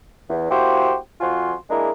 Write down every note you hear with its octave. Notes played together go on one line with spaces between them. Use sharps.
E2
A#3 E4 F#4 G4 C5
F2 F3 F4 F#4 G#5 C6
G#3 A#3 D4 E4 G#4 A#4